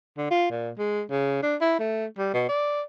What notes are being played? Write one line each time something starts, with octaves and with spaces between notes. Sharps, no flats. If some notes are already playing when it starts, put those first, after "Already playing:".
D3
F4
A#2
G#3
C#3
D4
E4
A3
G3
B2
D5